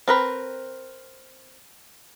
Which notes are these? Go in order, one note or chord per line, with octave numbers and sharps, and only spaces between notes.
C4 A#4 B4